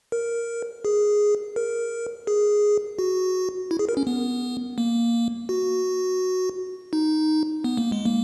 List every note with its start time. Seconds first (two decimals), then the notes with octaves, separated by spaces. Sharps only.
0.12 A#4
0.85 G#4
1.56 A#4
2.27 G#4
2.99 F#4
3.71 E4
3.79 G#4
3.89 A#4
3.97 C#4
4.07 B3
4.78 A#3
5.49 F#4
6.93 D#4
7.64 B3
7.77 A#3
7.92 G#3
8.06 A#3